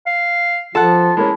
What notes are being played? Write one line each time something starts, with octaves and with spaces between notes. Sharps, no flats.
F5
F3 F4 A4 F#5 A5
G#3 A#3 C#4 E4